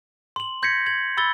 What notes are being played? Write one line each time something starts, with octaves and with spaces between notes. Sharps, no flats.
C6 F#7
C6 G6 G#6 A#6 B6 C#7
G#6 F#7
B5 E6 A6 G7